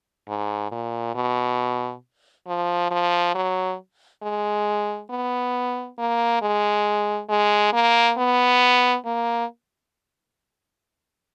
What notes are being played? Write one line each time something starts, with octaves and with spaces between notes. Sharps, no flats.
G#2
A#2
B2
F3
F3
F#3
G#3
B3
A#3
G#3
G#3
A#3
B3
A#3